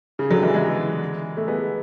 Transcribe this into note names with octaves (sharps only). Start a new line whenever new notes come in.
C#3
D3 F#3
E3 G#3
E3 G#3
A3
G#3 B3